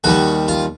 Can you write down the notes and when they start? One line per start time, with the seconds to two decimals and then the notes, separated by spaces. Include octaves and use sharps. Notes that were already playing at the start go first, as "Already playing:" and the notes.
0.04 D#2 D#3 G3 F#4
0.48 F4